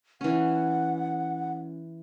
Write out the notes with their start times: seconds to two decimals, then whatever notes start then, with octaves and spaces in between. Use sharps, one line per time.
0.21 E3 C#4 F#5